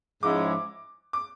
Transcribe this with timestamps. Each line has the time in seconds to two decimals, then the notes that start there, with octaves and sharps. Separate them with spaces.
0.22 G#2 F3 G#3 C#4 E4 D6
1.13 D6